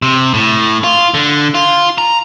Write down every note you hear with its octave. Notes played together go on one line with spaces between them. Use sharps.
C3
A2
F4
D3
F4
A#5